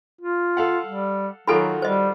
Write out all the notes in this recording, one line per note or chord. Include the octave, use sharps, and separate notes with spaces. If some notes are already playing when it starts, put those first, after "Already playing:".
F4
A4 F5 F#5
G3
D#3 F#3 F4 F#4 A4 G#5 B5
G3 C5 D#5